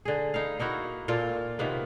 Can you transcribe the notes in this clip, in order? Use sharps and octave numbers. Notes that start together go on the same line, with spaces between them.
D3 G#4
D#4 E4 F5
A#3 D#4 E4 F#4
A#2 A#3 F4 A4
C3 D#3 A#3 B3